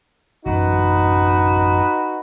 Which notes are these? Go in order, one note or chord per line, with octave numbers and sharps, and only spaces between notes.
A1 F#2 F#3 D#4 F#4 B4